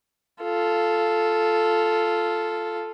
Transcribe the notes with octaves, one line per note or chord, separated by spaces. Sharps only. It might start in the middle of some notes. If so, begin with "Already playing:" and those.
F4 A4